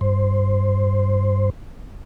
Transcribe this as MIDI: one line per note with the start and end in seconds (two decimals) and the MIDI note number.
0.01 1.50 43
0.01 1.50 72